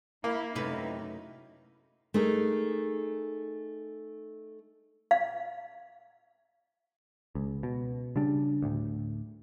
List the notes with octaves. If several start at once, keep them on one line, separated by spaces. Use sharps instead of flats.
A#3 E4
F#2 C3 A3 D#4 E4 B4
A3 D#4 G#4 A#4
F5
C#2
B2
C#3 G3 D4
D2 A2